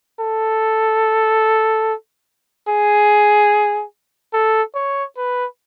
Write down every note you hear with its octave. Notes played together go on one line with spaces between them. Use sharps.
A4
G#4
A4
C#5
B4